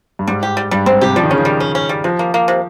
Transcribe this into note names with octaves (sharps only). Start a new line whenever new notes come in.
G2
G#2 G3
G4
G3
G2 G3
G#2 C4
C3 G4
F3 G3
D#3
C#3 C#4
D#3
G3
C#4
C#4
G3
C3 F3
A#3
A#3
C3